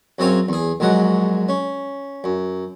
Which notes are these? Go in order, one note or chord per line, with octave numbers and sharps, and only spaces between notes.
F#2 F#3 C4 G#4 C#5 F5
E2 G#4
A#1 G#2 F#3 G#3 F#5
C#4
F#2